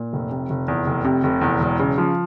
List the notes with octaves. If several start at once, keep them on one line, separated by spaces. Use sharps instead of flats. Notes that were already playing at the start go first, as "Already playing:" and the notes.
Already playing: A#2
F1
C3
F1
E2
F1
C3
F1
E2
E1
C#3
F3